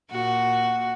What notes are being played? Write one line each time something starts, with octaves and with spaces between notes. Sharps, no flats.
A#2 F#4